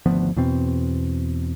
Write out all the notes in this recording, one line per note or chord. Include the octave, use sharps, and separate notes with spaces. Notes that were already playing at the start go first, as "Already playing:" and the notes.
G#1 D2 F3 B3
E2 B2 C4